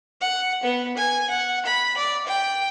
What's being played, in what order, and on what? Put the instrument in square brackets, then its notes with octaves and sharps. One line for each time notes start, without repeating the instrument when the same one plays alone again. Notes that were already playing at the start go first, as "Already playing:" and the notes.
[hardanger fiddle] F#5
B3
G#5
F#5
B5
D5
G5